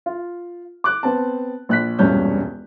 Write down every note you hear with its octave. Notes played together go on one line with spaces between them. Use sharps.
F4
D6 F#6
B3 C4 A5
A#1 F#6 B6
E1 A#1 G2 C#4 G6